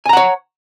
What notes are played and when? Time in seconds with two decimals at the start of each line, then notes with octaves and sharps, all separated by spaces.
0.06 G#5
0.09 A#5
0.13 F#5
0.17 C#5